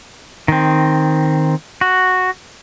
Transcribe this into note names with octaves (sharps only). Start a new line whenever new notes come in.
D#3 C4
F#4